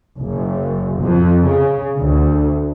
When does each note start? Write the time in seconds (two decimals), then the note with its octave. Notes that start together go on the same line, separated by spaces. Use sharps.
0.19 F#1
1.02 F2
1.47 C#3
1.98 D2